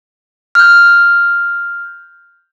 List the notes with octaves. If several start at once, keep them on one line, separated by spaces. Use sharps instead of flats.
F6 G6